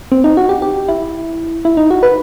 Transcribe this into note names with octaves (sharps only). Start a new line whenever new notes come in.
C4
D#4
F#4
G4
G4
E4
E4
D#4
F#4
B4